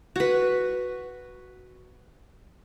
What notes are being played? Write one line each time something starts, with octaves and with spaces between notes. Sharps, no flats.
F#4 B4